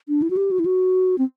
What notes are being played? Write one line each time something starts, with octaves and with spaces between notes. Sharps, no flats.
D4
E4
F#4
G4
F#4
E4
F#4
C4